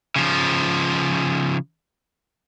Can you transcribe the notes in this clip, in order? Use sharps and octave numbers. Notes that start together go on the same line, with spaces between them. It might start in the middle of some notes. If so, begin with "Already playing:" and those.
C#3 F3